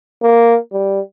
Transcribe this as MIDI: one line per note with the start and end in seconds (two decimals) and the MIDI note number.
0.23 0.57 58
0.73 1.00 55